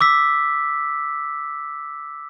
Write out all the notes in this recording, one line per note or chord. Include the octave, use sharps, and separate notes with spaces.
D6 E6 B6